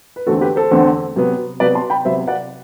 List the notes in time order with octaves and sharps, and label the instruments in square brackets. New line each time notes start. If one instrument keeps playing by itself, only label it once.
[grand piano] B4
E2 D3 A3 C4 F#4 A4
G4 B4
A4 C5
E2 D3 A3 C4
C3 F#3 B3
C3 F#3 B3 B4 D5
A5 C6
G5 B5
C3 F#3 B3 C5 E5
D5 F#5